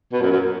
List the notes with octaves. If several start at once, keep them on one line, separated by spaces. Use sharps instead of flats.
B2
F#2
F#2